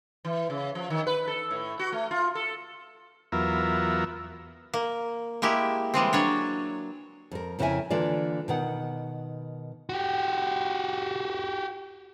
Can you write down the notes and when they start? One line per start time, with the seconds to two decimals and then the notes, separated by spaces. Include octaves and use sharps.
0.25 E3
0.50 C#3
0.75 F3
0.90 D#3
1.07 B4
1.27 A4
1.51 A2
1.79 F#4
1.92 A3
2.11 F4
2.35 A4
3.32 E2 F#3 B3 F4 A#4 E5
4.74 A#3
5.42 G#3 A#3 E4 G4
5.94 E3 G3 G#3 C4
6.13 F#3 D4 C#5
7.31 F2 A#4
7.59 F2 C#3 E4 A#4 E5 G#5
7.90 D3 E3 A#3 F4 D5
8.48 B2 D#3 F#5
9.89 F#4 G4